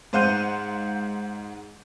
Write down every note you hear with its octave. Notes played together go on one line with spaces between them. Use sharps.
G#2 C5 F5 F#5 G6 D#7